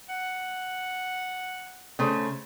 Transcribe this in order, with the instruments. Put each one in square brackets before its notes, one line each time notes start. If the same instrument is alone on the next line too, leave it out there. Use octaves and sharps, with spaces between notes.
[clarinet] F#5
[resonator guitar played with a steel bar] C#3 A3 C5